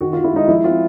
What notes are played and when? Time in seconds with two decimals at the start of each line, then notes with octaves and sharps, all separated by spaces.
0.01 D#3 F#4
0.13 D#3 F4
0.24 E4
0.33 G#3 D#4
0.48 F3 E4
0.64 C4 F4